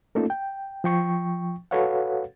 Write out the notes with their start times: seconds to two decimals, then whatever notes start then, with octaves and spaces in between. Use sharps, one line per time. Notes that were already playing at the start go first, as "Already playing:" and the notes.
0.15 A3 A#3 C#4 D#4 F4 A4
0.30 G5
0.84 F3 G5 C#6
1.71 F#4 A4 B4 C#5 F5 F#5